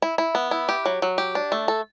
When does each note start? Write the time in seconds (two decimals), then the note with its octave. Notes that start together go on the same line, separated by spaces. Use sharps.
0.02 E4
0.18 E4
0.35 B3
0.51 E4
0.69 G4
0.86 F#3
1.02 F#3
1.18 G4
1.35 D4
1.52 A3
1.68 A4